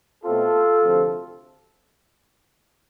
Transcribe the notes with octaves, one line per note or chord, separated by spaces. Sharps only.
B2 A3 C4 F4 A4
D2 C3 F3 C4